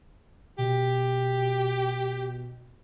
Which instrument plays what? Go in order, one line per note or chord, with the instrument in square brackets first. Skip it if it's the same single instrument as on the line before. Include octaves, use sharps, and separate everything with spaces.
[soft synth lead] B2 [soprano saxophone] G4